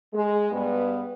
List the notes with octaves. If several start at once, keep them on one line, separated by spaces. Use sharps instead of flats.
G#3
G2 B3